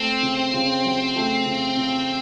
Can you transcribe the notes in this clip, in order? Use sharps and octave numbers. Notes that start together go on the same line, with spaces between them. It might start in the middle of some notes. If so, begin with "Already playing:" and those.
Already playing: A3 C4
C#3
C#3
F#3
A3
C#3
C#3